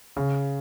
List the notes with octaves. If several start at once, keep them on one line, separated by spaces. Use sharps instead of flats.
C#3